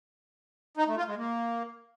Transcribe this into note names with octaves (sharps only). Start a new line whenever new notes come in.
D#4
A3
F4
G#3
A#3